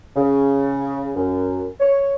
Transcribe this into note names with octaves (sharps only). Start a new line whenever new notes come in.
C#3
F#2
C#5